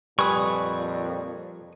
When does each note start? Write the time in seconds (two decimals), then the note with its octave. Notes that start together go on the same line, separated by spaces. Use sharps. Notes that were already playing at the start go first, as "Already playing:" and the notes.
0.19 F2 A#2 G3 B4 G#5 C#6 D#6